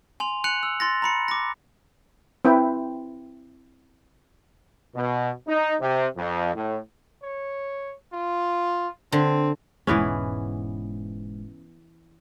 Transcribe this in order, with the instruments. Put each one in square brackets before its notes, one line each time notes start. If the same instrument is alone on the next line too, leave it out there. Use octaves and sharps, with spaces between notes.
[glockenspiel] G#5 C6 F7
G#5 F#6 C#7 F7 F#7
E6
C6 A6 A#6
A#5 B5 C#7
D6 A#6
[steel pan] C4 E4 B4 G5
[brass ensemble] B2
D#4
C3
F2
A2
[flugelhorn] C#5
F4
[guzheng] D3 [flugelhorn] C4
[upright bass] E1 G#2 [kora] E3 B3 C#4